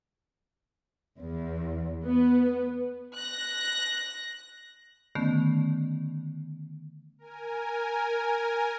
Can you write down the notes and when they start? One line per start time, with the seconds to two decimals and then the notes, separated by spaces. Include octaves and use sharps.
1.19 E2
2.04 B3
3.15 F#6 A#6
5.15 D3 D#3 A3 B3 C#4
7.18 A#4 G#5